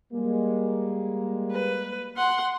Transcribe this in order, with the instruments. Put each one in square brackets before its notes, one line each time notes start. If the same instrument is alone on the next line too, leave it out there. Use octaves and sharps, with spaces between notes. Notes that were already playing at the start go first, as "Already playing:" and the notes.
[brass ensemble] G3 G#3 A#3
[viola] B4
F#5 C6